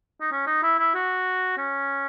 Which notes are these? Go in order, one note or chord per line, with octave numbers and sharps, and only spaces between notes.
D#4
C#4
D#4
E4
E4
F#4
C#4